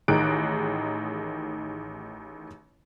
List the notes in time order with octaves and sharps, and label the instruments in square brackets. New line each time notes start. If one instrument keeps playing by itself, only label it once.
[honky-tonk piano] A1 D#3 D#4 G#4 F#6 D7